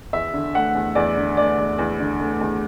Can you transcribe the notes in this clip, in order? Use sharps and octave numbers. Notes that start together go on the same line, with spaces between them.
E2 E5
D3
A3 F#5
E2
E2 D5
D3
A3 D5
E2
E2
D3
A3
E2